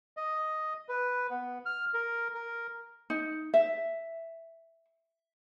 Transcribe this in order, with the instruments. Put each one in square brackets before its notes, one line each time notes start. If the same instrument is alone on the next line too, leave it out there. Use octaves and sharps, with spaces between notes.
[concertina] D#5
B4
B3
F6
A#4
A#4
[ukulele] D#4
E5